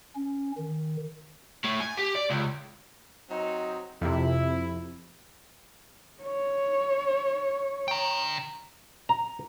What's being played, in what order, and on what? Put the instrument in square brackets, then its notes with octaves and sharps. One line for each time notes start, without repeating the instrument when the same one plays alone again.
[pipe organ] C#4
D#3
[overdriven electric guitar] A2
G#5
G4
D5
C#2
[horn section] F#3 C4 D#4
[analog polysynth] F2 C3 [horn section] E4
[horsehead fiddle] C#5
[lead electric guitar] G5 A#5
[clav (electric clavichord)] A#5